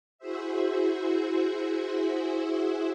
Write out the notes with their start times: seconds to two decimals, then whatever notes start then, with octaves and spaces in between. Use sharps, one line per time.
0.18 E4 F#4 G#4 C5 E5